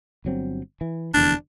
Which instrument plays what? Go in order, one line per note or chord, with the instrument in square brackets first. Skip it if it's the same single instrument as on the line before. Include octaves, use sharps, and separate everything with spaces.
[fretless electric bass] G1 F#3 C4
E3
[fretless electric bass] F1 E2 D3 [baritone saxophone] D4